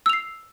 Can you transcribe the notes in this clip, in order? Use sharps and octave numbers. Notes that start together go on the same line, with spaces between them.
E6 C7 F7